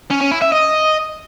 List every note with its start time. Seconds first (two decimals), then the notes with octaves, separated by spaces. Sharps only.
0.10 C#4
0.21 C#4
0.31 E4
0.42 E5
0.52 D#5